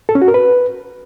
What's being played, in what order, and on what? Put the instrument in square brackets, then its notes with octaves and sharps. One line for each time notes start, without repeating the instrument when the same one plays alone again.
[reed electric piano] A4
C#4
F#4
A#4
B4